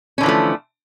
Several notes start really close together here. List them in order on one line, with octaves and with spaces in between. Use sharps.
C#4 D3 E3 F3 A3